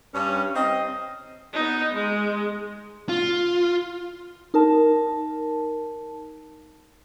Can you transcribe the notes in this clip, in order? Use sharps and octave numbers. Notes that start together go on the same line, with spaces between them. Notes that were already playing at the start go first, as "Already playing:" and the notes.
G2 C#4
C4 D#5
B3 D#4
G#3
F4
D#4 A#4 A5